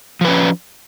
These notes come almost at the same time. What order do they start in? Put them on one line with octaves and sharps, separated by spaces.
F3 B4 C#4